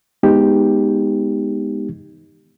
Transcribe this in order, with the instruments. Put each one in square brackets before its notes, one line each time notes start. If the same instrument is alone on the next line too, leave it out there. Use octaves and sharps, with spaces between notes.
[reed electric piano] G#3 B3 D#4 G4